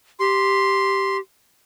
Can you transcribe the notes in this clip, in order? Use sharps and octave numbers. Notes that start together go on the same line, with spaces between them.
G4 C6